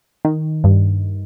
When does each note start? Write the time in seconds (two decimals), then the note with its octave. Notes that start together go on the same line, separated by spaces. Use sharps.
0.25 D#3
0.64 G2